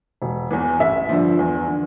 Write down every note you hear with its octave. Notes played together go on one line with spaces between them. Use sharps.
E1
E2 E3
A1 E5
G2 D3 F3
E2
D3